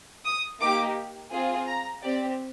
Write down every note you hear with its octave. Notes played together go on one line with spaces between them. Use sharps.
D#6
A#3 D#4 G4 D6
C4 F4 G#4
A#5
C4 G4 D5